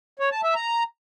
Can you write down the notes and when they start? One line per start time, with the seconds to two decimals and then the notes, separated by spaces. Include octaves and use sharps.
0.19 C#5
0.31 A5
0.43 E5
0.55 A#5